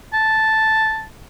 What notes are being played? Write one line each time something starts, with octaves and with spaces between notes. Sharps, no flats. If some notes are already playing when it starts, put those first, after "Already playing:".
A5